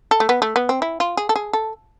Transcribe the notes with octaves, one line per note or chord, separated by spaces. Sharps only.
A4
A3
B3
A3
B3
C4
E4
F4
G#4
A4
G#4
A4